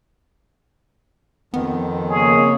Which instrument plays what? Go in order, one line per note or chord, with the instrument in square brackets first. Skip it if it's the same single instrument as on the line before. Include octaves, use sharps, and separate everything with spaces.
[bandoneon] F2 D#3 [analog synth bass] B3
[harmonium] C#3 A#3 C#5 [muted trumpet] G#4